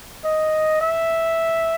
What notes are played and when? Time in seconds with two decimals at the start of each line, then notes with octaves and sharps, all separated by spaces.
0.24 D#5
0.81 E5